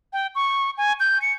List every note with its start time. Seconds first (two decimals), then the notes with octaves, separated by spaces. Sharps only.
0.13 G5
0.35 C#6
0.78 G#5
1.00 G6
1.22 C#7